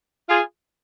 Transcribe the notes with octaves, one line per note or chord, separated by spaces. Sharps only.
F4 G#4